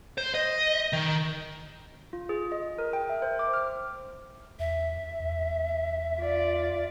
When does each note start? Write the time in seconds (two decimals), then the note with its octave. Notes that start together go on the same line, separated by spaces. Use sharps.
0.18 C5
0.34 D#5
0.93 D#3
2.13 F4
2.29 G#4
2.52 D#5
2.79 A#4
2.93 G5
3.10 E5
3.22 C5
3.39 D6
3.54 F6
4.59 E2 E5
5.20 E2
6.20 F4 D5